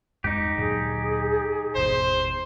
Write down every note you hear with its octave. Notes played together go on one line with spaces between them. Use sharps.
E2 G2 G#3 D#4 G4
D2 A#2 F#3 G#4
G#1 E2 B2 C5